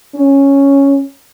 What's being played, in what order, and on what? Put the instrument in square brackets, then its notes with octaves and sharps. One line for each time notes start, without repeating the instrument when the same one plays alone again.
[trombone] C#4